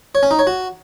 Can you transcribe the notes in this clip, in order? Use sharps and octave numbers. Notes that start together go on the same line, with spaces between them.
C#5
C#4
D#4
C#5
F#4